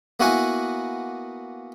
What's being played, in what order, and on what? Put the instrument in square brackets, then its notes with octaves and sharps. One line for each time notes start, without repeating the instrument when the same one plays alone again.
[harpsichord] A#3 B3 E4 F#4 F#5 G#5